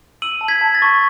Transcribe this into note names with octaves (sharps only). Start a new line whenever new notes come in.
E6 D#7 F#7
A5
G#6 B6
A5
A6
C#6